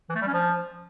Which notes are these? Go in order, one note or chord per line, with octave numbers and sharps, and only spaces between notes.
E3
A3
G3
C#4
F3